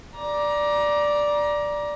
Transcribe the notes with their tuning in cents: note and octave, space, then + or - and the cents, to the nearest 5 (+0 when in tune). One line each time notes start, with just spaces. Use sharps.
D5 +0 A#5 +25